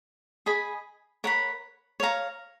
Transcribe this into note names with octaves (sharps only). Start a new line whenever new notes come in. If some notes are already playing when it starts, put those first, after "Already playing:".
G#4 D#5 G#5 B5
A#4 C#5 F#5 B5
C#5 F5 A#5